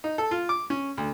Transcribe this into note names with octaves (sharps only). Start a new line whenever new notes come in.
D#4
A4
F4
D6
C#4
D2